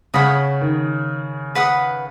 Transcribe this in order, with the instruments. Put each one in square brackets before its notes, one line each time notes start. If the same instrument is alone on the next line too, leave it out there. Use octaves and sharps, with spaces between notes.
[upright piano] C#3 [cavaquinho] C#5 F#5 B5 D#6
[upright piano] D#3
[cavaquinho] B4 F#5 B5 D#6